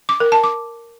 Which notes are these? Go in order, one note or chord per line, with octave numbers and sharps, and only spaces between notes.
D6
A#4
A5
D6